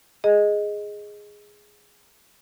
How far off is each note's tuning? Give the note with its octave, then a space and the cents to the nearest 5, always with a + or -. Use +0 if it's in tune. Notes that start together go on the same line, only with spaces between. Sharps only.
G#4 +0 D#5 +0